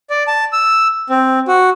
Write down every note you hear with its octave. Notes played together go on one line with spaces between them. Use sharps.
D5
A5
E6
C4
F#4